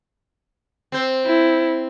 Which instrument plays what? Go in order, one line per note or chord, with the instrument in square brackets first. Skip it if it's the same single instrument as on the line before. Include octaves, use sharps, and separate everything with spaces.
[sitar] C4 C5
[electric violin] E4